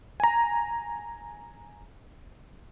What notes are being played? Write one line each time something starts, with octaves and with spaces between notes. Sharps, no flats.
G#5 A#5